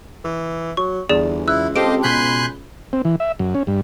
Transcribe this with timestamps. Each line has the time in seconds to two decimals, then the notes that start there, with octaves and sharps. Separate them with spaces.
0.24 E3
0.77 F#3 C#6
1.09 G1 E2 G#4 D5 E7
1.48 C#2 E4 E6 F#6
1.76 C4 G4 A4 C5 D#5 F5 D7
2.03 B2 G#5 B5 C6 F#6 G6
2.93 C4
3.05 E3
3.20 E5
3.39 F#2
3.55 C#4
3.67 G2